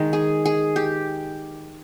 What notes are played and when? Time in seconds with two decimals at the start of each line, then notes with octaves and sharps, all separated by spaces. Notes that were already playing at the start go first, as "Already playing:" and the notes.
Already playing: D#3 G#3
0.13 G#4
0.45 G#4
0.76 G4